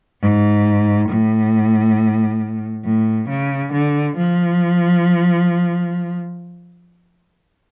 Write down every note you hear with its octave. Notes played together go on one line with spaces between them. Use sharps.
G#2
A2
A2
C#3
D3
F3